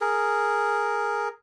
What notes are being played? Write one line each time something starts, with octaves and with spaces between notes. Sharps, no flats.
G#4 A#4